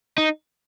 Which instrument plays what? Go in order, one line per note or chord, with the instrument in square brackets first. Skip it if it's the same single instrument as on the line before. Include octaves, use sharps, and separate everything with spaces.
[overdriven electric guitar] D#4